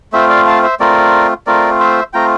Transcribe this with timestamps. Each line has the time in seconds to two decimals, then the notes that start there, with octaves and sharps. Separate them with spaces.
0.13 A3 C4 F4 C5 E5
0.29 D5 F5
0.47 F5 A5
0.63 C5 E5
0.80 A3 C4 F4 A#4 D5
1.47 A3 C4 F4 A#4 D5
1.80 C5 E5
2.13 A3 C4 F4 G5 A#5